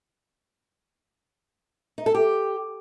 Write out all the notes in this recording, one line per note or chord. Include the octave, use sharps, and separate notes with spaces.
D#4
A4
G4